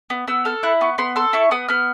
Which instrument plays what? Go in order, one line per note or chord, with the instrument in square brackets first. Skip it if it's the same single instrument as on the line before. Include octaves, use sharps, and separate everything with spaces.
[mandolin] B3
B3 E6
A4 F6
E4 F#6
B3 C#6
B3 C6
A4 C6
E4 C#6
B3 D#6
B3 F6